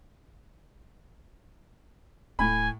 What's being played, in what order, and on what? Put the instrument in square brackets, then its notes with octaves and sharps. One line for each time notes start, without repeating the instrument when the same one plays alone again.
[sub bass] D1 [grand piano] A2 B5 [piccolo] G#5